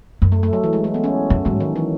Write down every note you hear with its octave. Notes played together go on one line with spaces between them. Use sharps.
F#2
A3
A3
F#3
E3
G#3
A3
B3
C#4
F#2
G#2 F#3
D#3
E3